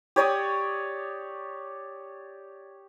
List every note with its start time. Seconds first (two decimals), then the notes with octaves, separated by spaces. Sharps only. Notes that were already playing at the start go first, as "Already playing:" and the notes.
0.16 G4 C#5 D5 D#6